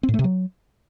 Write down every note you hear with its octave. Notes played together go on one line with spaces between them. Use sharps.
C4
A2
A3
C3
F#3